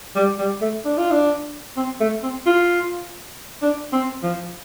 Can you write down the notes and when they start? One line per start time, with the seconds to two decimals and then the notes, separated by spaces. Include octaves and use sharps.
0.16 G3
0.38 G3
0.61 A3
0.85 D4
0.98 F4
1.11 D4
1.76 C4
2.00 A3
2.23 C4
2.46 F4
3.62 D4
3.93 C4
4.23 F3